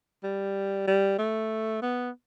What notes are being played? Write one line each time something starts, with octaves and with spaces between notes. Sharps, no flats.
G3
G3
A3
B3